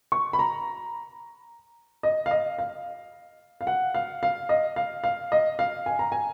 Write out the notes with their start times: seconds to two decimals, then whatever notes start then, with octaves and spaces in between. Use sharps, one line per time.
0.12 C#6
0.33 B5
0.39 A#5
2.03 D#5
2.26 F5
2.31 D#5
2.58 F5
3.61 F5
3.67 F#5
3.95 F5
4.23 F5
4.49 D#5
4.76 F5
5.04 F5
5.32 D#5
5.59 F5
5.86 G#5
5.99 A#5
6.12 G#5